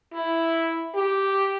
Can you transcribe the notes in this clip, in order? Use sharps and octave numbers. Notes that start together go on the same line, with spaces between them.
E4
G4